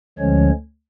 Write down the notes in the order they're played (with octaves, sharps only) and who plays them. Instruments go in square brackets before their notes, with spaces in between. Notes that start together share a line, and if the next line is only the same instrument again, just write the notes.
[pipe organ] D2 D3 F3 G#3 C#4 C#5